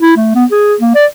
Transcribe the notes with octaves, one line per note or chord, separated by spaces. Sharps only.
E4
A3
B3
G#4
A#3
D5